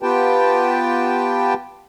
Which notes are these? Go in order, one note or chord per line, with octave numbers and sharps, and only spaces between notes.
B3 F4 G4 B4 G5 A5